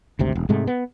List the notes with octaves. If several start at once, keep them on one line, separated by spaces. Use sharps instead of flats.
G#1 D2 C3
E1
G#2 C3 G#3 A3
B3